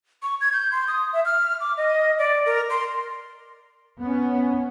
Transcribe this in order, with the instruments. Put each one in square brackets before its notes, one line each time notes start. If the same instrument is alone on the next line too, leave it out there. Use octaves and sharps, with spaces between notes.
[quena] C#6
G#6
G6
C6
D#6
E5
F6
D6
D#5
D5
A#4
C6
[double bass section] B3 C#4